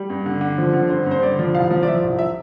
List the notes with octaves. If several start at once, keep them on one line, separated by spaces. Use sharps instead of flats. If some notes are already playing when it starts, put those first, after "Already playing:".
Already playing: G3
G2
D3
D3
F3
D3
G2 C5
G2
C5
D3 D5
F3
C2 F5
F3
D5
F3 E5
C2
E5